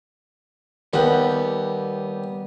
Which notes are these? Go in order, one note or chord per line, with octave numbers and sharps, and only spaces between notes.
D#2 G3 B3 F#5